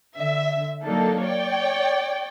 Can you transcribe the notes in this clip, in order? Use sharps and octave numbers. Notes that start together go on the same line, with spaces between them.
D3 E5
F#3 A#3 D4 D#4 A4
C#5 D5 G5